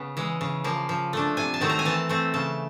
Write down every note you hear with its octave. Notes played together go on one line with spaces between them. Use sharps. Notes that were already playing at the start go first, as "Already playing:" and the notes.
Already playing: C#3 B3
E3 G#3
C#3
F3 A#3
F3
A3 D4
C3 G#5
A5
D#3 F#3 A3 C4
A#5
G#5
E3 A5
A3 C4
C#3 A5